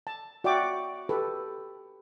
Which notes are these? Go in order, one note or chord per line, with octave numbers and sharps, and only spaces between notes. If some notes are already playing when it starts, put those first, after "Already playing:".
A5
F#4 D5 E5 G5 D6
G4 A4 B4